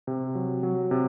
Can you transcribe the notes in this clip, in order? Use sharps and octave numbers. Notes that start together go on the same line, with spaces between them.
C3
F#3
F#3
C3